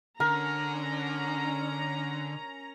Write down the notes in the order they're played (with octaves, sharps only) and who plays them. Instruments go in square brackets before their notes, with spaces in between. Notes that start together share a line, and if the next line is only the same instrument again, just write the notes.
[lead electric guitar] D3 [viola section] C#4 A#5 [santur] A#4